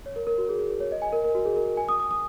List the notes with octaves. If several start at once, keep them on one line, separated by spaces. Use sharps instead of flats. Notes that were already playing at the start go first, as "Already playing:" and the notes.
C#5
A#4
A#4
F#4
G#4
G#4
G#4
C#5
D#5
G#5
A#4
A#4
F#4
G#4
A#4
G#5
D#6
D#6
D#6